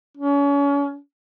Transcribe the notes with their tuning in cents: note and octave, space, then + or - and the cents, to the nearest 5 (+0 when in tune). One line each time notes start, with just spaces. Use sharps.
C#4 +35